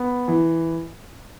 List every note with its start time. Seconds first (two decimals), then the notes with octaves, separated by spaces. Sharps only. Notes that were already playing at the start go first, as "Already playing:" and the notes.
Already playing: B3
0.28 E3